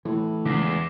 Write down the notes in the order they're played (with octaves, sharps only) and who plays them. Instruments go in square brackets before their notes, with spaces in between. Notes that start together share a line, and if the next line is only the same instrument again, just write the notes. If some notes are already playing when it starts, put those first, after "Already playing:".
[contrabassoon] A2 [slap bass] E3
[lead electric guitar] E2 [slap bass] C#3 G#3 A3 [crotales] D6 A#6 C7